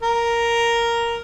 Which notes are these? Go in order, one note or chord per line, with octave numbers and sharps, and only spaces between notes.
A#4